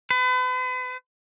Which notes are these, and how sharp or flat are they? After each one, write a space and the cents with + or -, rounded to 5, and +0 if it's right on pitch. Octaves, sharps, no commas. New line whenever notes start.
B4 +40